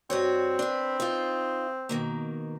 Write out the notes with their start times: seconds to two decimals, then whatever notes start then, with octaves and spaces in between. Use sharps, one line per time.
0.10 G2 C4 F#4 C#5
0.59 D4 B4
1.00 D#4 F4
1.89 B2 D#3 A#3